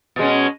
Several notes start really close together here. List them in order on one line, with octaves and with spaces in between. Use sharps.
B2 G#3 C#4